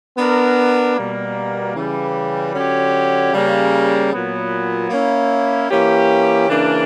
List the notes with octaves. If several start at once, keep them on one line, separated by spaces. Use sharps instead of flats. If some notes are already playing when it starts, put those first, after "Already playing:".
B3 D4 A#4
B2 G3 A#3
C#3 E3 G3
D3 F#3 C#4 G4
C#3 G3 A#3
A#2 F#3 B3
A#3 C#4 E4
E3 A#3 C#4 G4
C#3 E3 A#3 D4